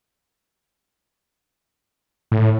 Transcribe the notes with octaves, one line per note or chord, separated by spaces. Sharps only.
A2